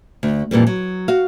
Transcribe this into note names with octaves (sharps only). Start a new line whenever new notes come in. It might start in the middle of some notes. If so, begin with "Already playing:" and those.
D2
F2 A#2 E3 G3
F#3
F#4 F5